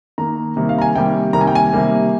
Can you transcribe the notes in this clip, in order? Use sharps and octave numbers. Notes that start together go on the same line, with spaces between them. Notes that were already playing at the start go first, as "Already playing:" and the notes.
D#3 A#3 A#5
C3 D#3 G3 A#3
F5
A#5
G#5
C3 D#3 G3 A#3 G5
C3 D#3 G3 A#3 A#5
G#5
G5
G#5
C3 D#3 G3 A#3